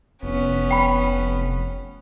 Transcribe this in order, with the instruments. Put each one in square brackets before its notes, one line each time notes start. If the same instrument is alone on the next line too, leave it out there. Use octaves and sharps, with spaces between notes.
[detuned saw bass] F1 [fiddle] B3 C#4
[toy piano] G5 B5